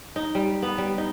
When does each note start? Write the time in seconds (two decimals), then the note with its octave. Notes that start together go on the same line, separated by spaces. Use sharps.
0.16 D#4
0.35 G3
0.63 B3
0.78 G3
0.98 D#4